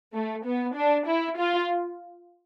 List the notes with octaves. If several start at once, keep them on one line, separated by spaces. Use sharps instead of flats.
A3
B3
D4
E4
F4